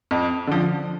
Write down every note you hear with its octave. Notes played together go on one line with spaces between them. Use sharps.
F2
D3 F3